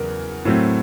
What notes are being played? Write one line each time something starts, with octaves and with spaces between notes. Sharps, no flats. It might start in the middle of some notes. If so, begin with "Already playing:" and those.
Already playing: E2 C#3 F#3 A#4
A2 F#3 A3 C4